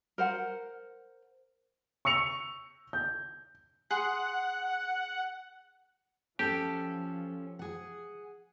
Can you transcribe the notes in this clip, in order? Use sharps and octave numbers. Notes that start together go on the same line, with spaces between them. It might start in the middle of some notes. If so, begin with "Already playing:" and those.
A#4 C5 F#5
C#6 E6 C#7 F7
G6
G#4 F#5 C6
F3 C#4 G4 A4
G#4 F#5